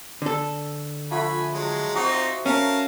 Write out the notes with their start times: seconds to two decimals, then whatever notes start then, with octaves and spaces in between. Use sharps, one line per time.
0.22 D3 A4
1.11 F3 A3 F#5 G#5 B5
1.53 F#3 G#3
1.95 C4 D#4 F4 F#4 C5
2.46 C#4 A#4 F5 A5